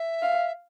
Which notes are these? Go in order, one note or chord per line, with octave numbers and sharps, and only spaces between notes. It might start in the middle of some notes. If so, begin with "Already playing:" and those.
Already playing: E5
F5